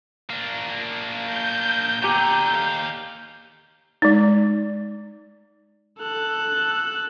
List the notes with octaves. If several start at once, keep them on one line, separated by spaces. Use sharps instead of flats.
A#3 D4
G6
B2 D3 G4 G#5 A#5
D#2 F5
G#3 D#4
A4 F#6